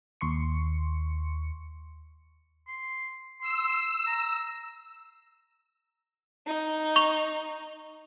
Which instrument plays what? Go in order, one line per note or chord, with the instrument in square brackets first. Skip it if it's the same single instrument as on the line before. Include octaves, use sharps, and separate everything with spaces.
[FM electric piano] D#2 C6 C#6 C#7
[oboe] C6
[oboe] C6 [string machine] E6
[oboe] A#5
[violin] D#4
[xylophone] C#6 F7